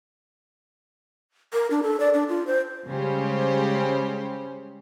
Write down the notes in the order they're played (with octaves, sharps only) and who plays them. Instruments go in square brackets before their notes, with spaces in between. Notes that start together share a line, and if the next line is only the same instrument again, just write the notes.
[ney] A#4
D4
A4
D5
D4
F4
C5
[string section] C#3 G3 G#3 C#4 G4 C5